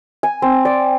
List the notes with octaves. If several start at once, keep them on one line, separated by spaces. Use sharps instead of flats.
G#5
C4
D5